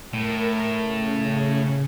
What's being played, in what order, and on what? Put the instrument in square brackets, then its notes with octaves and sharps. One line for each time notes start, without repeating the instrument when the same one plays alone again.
[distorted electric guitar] A2 [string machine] A#4
[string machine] C#3